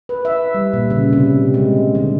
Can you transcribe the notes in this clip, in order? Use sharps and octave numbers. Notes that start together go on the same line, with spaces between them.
B4
E5
G3
A#2
C#3
C3
G#3
D3